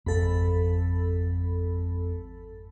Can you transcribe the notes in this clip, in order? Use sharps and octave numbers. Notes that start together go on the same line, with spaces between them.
G#1 F2 A4 B5